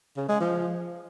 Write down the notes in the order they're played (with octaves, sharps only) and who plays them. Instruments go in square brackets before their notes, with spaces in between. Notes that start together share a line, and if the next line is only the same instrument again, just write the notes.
[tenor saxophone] C#3
G#3
F3